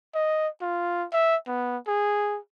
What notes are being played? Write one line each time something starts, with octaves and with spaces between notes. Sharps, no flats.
D#5
F4
E5
B3
G#4